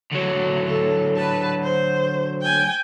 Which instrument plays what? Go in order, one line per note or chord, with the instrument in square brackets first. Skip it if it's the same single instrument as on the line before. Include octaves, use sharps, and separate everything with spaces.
[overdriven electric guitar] D3 F#3
[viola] A4
B4 A5
C5
G5 G#5